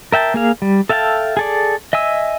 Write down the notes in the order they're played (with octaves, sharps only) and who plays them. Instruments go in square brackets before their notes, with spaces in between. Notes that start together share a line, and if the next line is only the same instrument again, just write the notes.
[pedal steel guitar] A#4 E5 G5 A5
A#3 G#4 F5
G3
A4 E5 F5 G5 A5
G#4 A4 D5
D#5 E5 G#5 E6